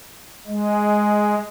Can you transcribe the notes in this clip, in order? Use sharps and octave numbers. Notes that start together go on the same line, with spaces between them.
G#3